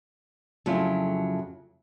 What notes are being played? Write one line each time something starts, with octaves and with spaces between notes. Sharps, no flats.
F2 C#3 F#3 A3 E4 F4